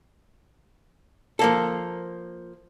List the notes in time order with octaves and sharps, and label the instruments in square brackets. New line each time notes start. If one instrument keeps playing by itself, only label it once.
[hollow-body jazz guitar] F3 A#3 A4